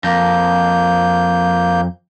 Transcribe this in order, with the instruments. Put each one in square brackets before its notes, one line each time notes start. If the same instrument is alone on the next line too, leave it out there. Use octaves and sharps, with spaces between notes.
[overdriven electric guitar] F2 [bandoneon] A#3 G6